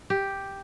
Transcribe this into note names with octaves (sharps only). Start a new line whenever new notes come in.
G4